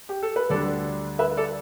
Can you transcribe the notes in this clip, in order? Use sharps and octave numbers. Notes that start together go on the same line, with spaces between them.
G4
A4
B4
D2 D3 G3 D4 A4 D5
B4 E5
A4 D5